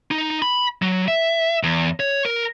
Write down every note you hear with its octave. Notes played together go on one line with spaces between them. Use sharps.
D#4
B5
F#3
E5
E2
C#5
A#4